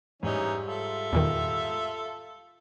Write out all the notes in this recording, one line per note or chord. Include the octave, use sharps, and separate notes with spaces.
G#2 E3 G3 C#4 D#4
F4 A4 E5
E2 A#2 D#3